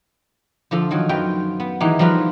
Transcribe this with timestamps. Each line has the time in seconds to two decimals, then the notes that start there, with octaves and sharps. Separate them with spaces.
0.71 D3 F3 F4 A4
0.91 D#3 F3 F#3
1.09 F#2 B3 F4 G5
1.60 B3
1.80 D#3 E3 G#3 D#4 G4
1.99 F3 G3 F4 A#4 B4